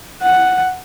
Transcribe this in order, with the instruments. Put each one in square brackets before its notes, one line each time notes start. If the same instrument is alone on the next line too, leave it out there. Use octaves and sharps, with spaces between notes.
[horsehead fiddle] F#5